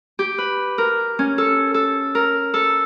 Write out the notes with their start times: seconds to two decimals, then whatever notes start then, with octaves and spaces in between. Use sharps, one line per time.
0.19 G4
0.38 B4
0.78 A#4
1.19 C#4
1.38 A4
1.74 A4
2.15 A#4
2.54 A4